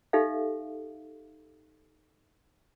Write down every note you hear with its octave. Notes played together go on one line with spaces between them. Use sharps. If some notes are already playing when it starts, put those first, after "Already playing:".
D#4 G4 A4 E5 F5